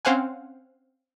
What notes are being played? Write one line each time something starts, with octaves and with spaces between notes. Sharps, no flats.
C4 C#4 C5 F5 F#5 G#5